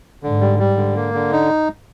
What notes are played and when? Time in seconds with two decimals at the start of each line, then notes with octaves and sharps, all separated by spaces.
0.23 G#2 D3
0.41 G3
0.59 G3
0.76 D3
0.96 A#3
1.14 D3
1.32 D#4